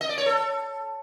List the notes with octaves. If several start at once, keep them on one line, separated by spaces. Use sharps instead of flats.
D#5
D5
C#5
A4